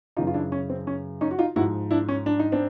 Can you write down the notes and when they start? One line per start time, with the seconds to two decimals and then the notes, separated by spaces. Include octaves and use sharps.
0.17 F#2 C#3 E3 D#4 F4
0.27 F4
0.34 D4 E4
0.52 C#4
0.70 C4
0.87 C#4
1.21 C#4 D#4
1.31 F#4
1.39 D#4 F4
1.56 G#2 F3 E4 F#4
1.91 D4 E4
2.09 C#4
2.26 D4
2.39 D#4
2.52 C4 D4